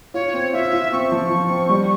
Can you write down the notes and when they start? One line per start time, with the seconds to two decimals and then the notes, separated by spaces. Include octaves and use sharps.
0.14 F4 C#5
0.33 C4
0.53 F4 E5
0.73 F4
0.92 C4 C#6
1.12 F3
1.30 F3
1.49 C4
1.69 G3